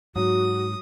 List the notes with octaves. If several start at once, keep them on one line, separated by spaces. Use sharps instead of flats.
G#2 F#3 F#4 D#6